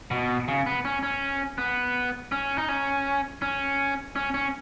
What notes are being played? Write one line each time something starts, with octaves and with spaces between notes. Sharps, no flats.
B2
C#3
B3
C#4
C#4
B3
C#4
D#4
C#4
C#4
C#4
C#4